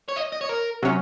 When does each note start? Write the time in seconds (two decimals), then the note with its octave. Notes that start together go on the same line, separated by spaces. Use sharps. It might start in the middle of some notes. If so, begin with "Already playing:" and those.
0.09 C#5
0.16 D#5
0.32 D#5
0.41 C#5
0.49 A#4
0.82 C3 F#3 C#4